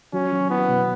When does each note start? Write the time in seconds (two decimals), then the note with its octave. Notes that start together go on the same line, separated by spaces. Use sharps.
0.13 F#3 C#4
0.32 F#3
0.49 B3 E4
0.68 B2